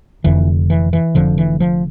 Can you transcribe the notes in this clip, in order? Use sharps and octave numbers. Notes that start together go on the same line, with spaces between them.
F1 F2 D3 E3
E3
E3
F1 F2 D3 F3
E3
F3